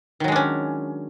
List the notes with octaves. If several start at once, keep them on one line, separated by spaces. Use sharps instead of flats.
D#3 F#3 G#3 C#4 D4